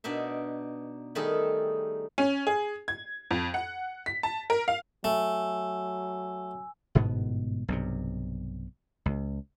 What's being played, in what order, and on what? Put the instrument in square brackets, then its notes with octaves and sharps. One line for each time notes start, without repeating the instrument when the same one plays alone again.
[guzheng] B2 D4 D#4 E5
D#3 G3 A3 D#4 G#4 A4
[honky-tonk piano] C#4
G#4
G#6
F2
F#5
B6
A5
A#4
F5
[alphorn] F#3 [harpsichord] A3 [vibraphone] G#5 E6
[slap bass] G1 G#2 B2 B3
B1 G2 C3
C#2